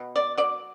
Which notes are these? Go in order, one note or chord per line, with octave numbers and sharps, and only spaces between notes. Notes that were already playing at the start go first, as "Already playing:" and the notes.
Already playing: B2
D5
F#3 D5